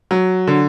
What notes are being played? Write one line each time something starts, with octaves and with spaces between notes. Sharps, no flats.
F#3
D3